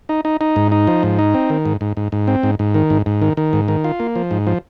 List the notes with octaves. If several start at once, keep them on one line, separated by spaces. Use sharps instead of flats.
D#4
D#4
D#4
G#2
D#4
F3
G#2
D#4
C4
D#3
G#2
G#2
G#2
G#2
C4
G#2
G#2
D#3
G#2
G#2
D#3
D#3
G#2
D#3
F4
A#3
F3
G#2
F3